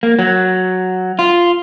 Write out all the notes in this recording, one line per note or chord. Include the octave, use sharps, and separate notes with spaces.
A#3
F#3
F4